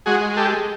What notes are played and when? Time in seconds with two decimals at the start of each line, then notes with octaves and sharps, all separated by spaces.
0.06 G#3 F#4 G#4
0.37 G4 A4